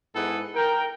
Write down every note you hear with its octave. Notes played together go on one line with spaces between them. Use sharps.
G#2 B3 E4 G#4 A4 F#5
A#4 G5